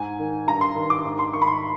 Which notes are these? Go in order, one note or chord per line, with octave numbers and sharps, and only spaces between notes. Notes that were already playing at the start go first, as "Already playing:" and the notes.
Already playing: G#2 G#5
D#3
G2 A#5
C6
D#3
D6
G#2
C6
D#3 C#6
B5
C6